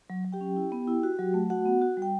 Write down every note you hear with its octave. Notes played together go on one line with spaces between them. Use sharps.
F#3
F#3
G4 G5
C#4
E4
B3
E4
F#4
F#3
A3
F#4 F#5
B3
F#4
G3
G5